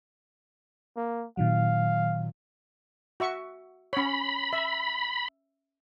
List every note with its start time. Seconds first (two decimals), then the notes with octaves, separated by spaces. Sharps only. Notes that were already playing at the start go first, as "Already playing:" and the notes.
0.96 A#3
1.37 A#2 D#3 F#3 F5
3.20 F#4 E5 C#6
3.93 C#4 C#5 B5
4.53 E5